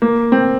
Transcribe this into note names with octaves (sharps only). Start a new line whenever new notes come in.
A#3
C4